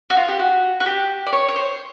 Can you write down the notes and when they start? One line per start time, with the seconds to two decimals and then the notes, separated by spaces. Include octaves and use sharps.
0.10 F#4
0.17 F4
0.28 G4
0.39 F#4
0.80 F#4
0.86 G4
1.27 D5
1.33 C#5
1.48 C#5
1.56 C5